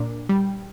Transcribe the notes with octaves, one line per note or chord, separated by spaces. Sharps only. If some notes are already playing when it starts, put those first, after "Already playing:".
Already playing: A#2 D4
G3